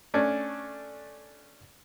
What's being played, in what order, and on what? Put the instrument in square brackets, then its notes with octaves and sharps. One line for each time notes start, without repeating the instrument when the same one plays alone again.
[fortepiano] A3 C#4 D4